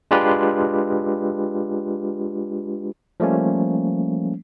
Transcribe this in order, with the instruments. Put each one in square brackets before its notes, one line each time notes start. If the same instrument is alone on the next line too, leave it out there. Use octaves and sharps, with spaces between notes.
[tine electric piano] G#3 D4 F4 G4 B4
F3 G3 A3 A#3 C#4